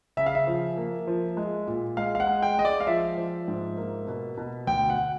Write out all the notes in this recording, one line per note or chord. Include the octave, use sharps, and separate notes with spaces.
C#3 E5
F5
E5
F3
A#3
F3
G#3
A#2
G#3 F5
F5
F#5
G#3
G5
G#3 D#5
D5
F5
F3 E5
F3
G#2
A#3
B2
B2
D2 G5
F#5